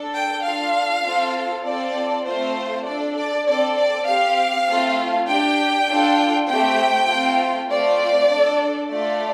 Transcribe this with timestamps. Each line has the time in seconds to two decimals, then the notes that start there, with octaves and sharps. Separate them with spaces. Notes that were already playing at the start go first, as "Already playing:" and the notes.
Already playing: D4 A4
0.15 G5
0.45 D4 F4 A4 F5
1.05 C4 F4 A4
1.65 C4 F4 A4 D5
2.25 A3 C4 F4 A4 C5
2.85 D4 A4 D5
3.16 D5
3.46 C4 A4 D5
3.76 D5
4.06 C4 G4 F5
4.67 A3 C4 F4 A4
5.27 D4 G4 G5
5.88 D4 F4 A4
6.47 A3 C4 G4 G5
7.08 A3 C4 F4
7.68 A3 C4 F4 D5
8.28 D4 A4
8.89 A3 F4 A4 D5